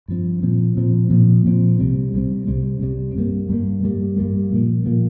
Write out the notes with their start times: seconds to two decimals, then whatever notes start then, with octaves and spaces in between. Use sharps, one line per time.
0.08 G2 F3 C4
0.43 A#2 F3 C4
0.77 A#2 F3 C4
1.10 A#2 F3 C4
1.45 A#2 F3 C4
1.79 C2 C3 G3 C4
2.13 C2 C3 G3 C4
2.47 C2 C3 G3 C4
2.81 C2 C3 G3 C4
3.16 G2 G3 A#3
3.49 G2 G3 A#3
3.84 G2 G3 A#3
4.18 G2 G3 A#3
4.52 A#2 F3 A#3
4.86 A#2 F3 A#3